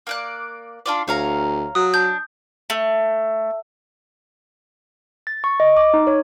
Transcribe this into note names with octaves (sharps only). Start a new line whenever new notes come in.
A#3 D5 F#6
D4 F4 D5
D2 C#5 F5 A#5
F#3 D#6
D4 G6
A3
A6
C#6
D#5
D6
D#4
C#5